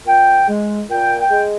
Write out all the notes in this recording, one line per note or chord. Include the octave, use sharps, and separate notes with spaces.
A#2 G5
G#3
A#2 G5
G5
G#3